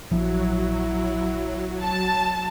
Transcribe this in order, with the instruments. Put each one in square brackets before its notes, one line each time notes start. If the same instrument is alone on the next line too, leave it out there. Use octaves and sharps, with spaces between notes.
[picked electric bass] A#1 F3 [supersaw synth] F#3 [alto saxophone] E4
[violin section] A5